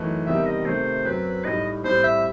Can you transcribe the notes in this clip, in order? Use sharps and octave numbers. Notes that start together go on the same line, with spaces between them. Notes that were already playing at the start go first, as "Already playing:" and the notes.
Already playing: F#2 E3 A3 D#4
E2 C3 D#3 G3 D#4 E5
D#5
C3 D#3 A3 C5
F#2 F#3 C4 B4
A2 G3 D#4 D#5
A2 G3 C4 C5
E5